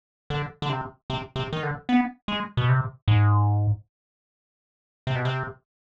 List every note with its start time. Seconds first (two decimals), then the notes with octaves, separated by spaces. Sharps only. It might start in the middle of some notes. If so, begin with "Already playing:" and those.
0.30 D3
0.62 D3
0.69 C3
1.10 C3
1.36 C3
1.53 D#3
1.63 D3
1.89 B3
2.28 G#3
2.57 B2
2.69 C3
3.08 G#2
5.07 C3
5.16 B2
5.25 C3